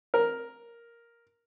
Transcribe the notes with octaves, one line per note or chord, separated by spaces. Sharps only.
A#4